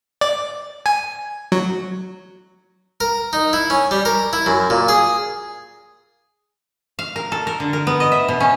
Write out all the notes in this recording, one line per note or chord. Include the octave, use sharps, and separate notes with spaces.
D5
G#5
F#3
A#4
D#4
E4
C#4
G3
A#4
E4
F#2
A#2
G#4
F5
A#4
A4
A#4
D3
A#4
B3
D#5
E5
B2
C#4